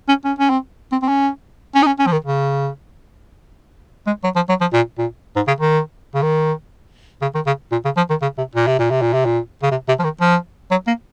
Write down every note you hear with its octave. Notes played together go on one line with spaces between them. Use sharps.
C#4
C#4
C#4
C4
C4
C4
C#4
C#4
D#4
C#4
C#4
F3
D#3
C#3
G#3
F#3
F3
F#3
F3
A#2
A#2
G#2
C#3
D#3
C#3
D#3
C#3
D#3
C#3
A#2
C#3
F3
D#3
C#3
C3
A#2
C3
A#2
C3
A#2
C3
A#2
C#3
C3
C3
F3
D#3
F3
F#3
A#3